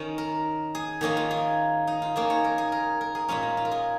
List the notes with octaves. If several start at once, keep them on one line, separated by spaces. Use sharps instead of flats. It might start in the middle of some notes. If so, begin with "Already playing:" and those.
Already playing: D#3 C#4
A#4
G#4
D#3 A#3 C#4 D#4
F4
G#4
D#4
F4
D#3 A#3 C#4 G#4
C#5
A#4
G#4
A#4
A#4
G#4
A#2 G#3 C#4 F4
D#4
F4
A#4
G#4